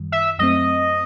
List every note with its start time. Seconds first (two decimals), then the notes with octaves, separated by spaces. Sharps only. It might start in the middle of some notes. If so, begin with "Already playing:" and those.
Already playing: F#2 D#3 G3
0.12 E5
0.39 F#2 F#3 A3 C4 D#5